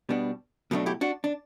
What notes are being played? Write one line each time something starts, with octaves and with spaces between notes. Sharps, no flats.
B2 G3 B3 D4
B2 F#3 A3 D4
E4 G4
D4 F#4
D4